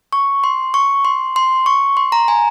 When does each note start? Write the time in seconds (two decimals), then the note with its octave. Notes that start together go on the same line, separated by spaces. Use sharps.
0.13 C#6
0.44 C6
0.74 C#6
1.05 C6
1.36 C6
1.66 C#6
1.97 C6
2.12 A#5
2.28 G#5